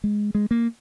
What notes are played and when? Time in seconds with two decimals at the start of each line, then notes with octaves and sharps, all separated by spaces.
0.04 G#3
0.35 G#3
0.51 A#3